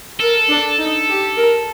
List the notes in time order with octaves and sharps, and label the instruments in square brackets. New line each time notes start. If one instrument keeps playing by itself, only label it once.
[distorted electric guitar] A4 [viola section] A#4
[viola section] D4
D#4
G4
A#4